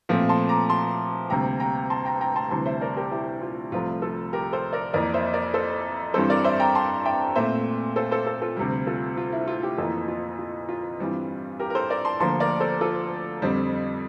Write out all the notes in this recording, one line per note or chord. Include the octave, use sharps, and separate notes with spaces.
A#2 F3 A3 C4
A5 C6
A#5 D6
A5 C6
D2 C3 G3 A#3 G5 A#5
G5 A#5
A5 C6
G5 A#5
G5 A#5
A5 C6
D2 C3 E3 G3 A5 C6
C5 E5
A#4 D5
G4 A#4
E4 G4
F4
C2 C3 F3 A3 F4
F4 A4
G4 A#4
A4 C5
A#4 D5
F2 E3 A#3 A#4 D5
C5 E5
A#4 D5
A4 C5
G2 E3 G3 C4 A4 C5
A#4 D5
C5 E5
G5 A#5
A5 C6
E5 G5
A#2 A3 C4 C5 E5
A4 C5
A4 C5
A4 C5
F4 A4
D2 C3 G3
F4 A4
F4
E4
F4
E4 G4
F2 E3 A#3 F4 A4
F4
F4
F4
G2 E3 G3 C4
G4 A#4
A#4
A4 C5
A#4 D5
A5 C6
D2 D3 F3 A#3 A5 C6
A#4 D5
A4 C5
F4 A4
F2 D3 G3 C4